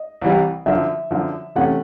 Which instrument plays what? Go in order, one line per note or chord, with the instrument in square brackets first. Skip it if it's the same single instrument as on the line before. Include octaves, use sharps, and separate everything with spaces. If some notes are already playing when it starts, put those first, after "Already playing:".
Already playing: [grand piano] D#5
[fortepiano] C2 C3 E3 G3
[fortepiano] F#2 D3 F3 [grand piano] E5
[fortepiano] F#2 D3 F3
[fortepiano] C3 E3 A3 C#4 [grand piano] F#5